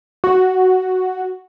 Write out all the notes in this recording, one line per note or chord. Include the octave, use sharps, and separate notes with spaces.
F#4